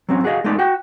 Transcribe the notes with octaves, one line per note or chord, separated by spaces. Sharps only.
F#3 C4 C#4
F#4 G#4 D5 D#5 F5
G#3 A3 B3 D#4 D5
F#4 F#5 G5